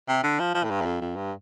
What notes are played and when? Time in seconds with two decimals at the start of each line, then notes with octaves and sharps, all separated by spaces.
0.08 C3
0.23 D3
0.39 F3
0.54 F3
0.64 A2
0.70 G2
0.81 E2
0.85 F2
1.01 F2
1.16 G2